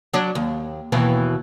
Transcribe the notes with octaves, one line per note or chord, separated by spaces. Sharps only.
F#3 D4
D#2
D#2 B2 E3